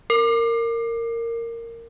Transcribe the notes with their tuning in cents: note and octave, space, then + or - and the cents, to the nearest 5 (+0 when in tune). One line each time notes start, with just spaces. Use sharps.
A#4 -15